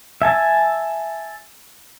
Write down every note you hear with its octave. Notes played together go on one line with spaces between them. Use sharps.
E5 G#5 A5